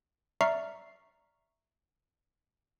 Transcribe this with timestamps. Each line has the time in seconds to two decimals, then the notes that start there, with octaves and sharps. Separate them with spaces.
0.41 D5 E5 A#5 C#6 F6 C7